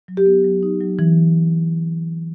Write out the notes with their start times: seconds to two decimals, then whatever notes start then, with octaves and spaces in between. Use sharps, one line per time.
0.08 F#3
0.17 G4
0.26 B3
0.45 F#3
0.63 D#4
0.81 F#3
0.99 E3